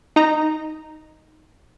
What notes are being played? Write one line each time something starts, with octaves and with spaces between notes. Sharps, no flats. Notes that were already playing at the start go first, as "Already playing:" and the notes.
D#4 A#5